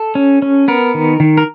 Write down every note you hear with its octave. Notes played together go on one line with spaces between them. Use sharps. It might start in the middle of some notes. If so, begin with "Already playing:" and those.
Already playing: A4
C#4
C#4
B3 A#4
D#3
D#3
A#4